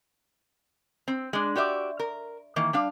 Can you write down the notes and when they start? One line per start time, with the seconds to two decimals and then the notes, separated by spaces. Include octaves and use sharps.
1.08 C4
1.33 G#3 D4
1.56 F#4 G4 D5 E5
2.00 A#4
2.56 D#3 E3 A#3
2.73 G3 D4 F5